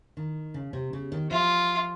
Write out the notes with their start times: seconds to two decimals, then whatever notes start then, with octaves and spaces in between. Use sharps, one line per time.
0.17 D#3
0.54 C#3
0.73 C3
0.93 C#3
1.12 D#3
1.31 F3 F4